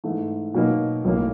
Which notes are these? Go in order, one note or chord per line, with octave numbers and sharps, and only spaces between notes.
G#2 E3 A3
B2 F#3 A#3 D#4
B1 A2 F#3 A#3